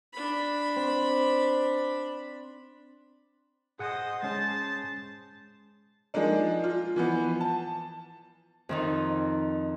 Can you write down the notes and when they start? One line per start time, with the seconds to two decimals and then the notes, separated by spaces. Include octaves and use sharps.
0.14 D4 B5
0.76 C4
3.79 G#4 C5 D#5 F#5 G#5
4.23 G#3 C#4 G#4 C5 A5
6.14 F3 G#3 A#3 D4 D#4
6.64 F4
6.96 E3 F3 B3
7.41 A5
8.69 F2 D#3 D#4